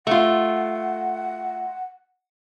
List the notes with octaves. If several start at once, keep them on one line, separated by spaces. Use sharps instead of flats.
A3 F4 F#5